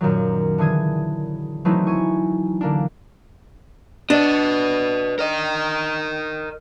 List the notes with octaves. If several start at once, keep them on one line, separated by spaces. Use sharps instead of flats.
F#2 A#2 D#3 F#3
D3 E3 G#4 G#6
E3 F#3 A3 C4 D#4 E4
G#5 C#6
D3 A#3 D4
D4 B4 D#5
A#4 D#5